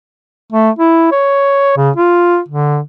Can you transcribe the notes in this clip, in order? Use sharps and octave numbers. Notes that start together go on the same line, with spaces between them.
A3
E4
C#5
C#3
F4
D3